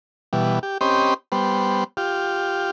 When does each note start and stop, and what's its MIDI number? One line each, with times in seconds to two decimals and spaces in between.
0.33 0.59 47
0.33 0.59 52
0.33 0.59 55
0.63 0.78 67
0.81 1.14 60
0.81 1.14 61
0.81 1.14 67
0.81 1.14 72
0.81 1.14 75
0.81 1.14 83
1.32 1.84 55
1.32 1.84 59
1.32 1.84 72
1.97 2.71 65
1.97 2.71 67